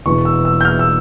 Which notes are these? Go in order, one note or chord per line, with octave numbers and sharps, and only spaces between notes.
E1 E2 E3 C#6
E6
E6
G6
F6
E6